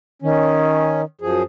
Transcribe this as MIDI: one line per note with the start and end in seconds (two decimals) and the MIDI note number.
0.22 1.04 51
0.22 1.01 61
1.21 1.43 42
1.21 1.43 53
1.21 1.43 68